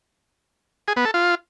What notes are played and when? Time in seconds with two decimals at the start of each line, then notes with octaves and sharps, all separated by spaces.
0.88 G#4
0.96 B3
1.05 A4
1.14 F4